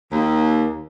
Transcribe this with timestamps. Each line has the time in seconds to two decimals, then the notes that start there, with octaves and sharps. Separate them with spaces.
0.12 D#2